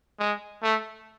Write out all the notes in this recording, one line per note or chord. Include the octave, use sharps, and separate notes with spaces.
G#3
A3